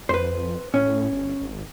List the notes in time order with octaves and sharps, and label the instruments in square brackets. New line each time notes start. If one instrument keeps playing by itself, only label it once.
[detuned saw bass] F2 [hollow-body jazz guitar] B4 C5
[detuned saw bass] A2 [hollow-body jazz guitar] C#4
[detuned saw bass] G1
G#1